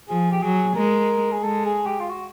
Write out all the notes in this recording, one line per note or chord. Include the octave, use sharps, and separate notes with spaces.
F3 G#4
G4
F#3 G#4
G#3 A#4
G#4
G#3 A4
G#4
G4
F4
F#4